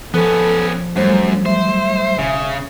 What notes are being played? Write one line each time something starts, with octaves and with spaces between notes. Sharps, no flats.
F3 B3 C#4 A4
F#2 F#3 G3 A3 C5
C5 E5
E1 C#3